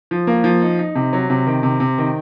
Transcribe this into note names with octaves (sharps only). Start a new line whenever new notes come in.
F3
A#3
F3
D#4
D#4
C3
F#3
C3
D#3
C3
C3
D#3